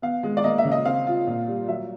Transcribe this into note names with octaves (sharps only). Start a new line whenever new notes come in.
B3 F5
G#3
D5
A#3 D#5
E5
C#3
D#5
C4 F5
F4
A#2
G3
F#3 E5